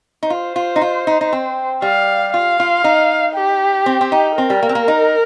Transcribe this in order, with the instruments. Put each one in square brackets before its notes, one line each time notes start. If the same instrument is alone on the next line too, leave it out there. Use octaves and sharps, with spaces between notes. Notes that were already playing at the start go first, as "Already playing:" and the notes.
[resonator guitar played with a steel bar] D#4
[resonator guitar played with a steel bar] F4 [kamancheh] C5
[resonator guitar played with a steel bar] F4
D#4
F4
D#4
D#4
C4
[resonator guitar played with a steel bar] G3 [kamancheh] F5
[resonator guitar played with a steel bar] F4 [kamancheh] F5
[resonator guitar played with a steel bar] F4
D#4
[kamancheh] G4
[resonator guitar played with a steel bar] C4
C4
D#4
[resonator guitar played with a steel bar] C4 [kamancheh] A#4
[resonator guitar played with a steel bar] G3
A#3
C4
A#3
D#4